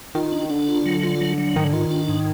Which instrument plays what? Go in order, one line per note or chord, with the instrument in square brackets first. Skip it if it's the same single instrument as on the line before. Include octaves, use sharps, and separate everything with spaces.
[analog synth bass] D#3 [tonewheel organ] F4
[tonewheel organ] D4
[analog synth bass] D3 [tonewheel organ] D4
[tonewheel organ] F4
F#3
F4
F#3
F#3
[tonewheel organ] G#2 [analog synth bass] D#3
[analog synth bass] D3
[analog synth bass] D#3 [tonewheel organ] F4
[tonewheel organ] D4
G#2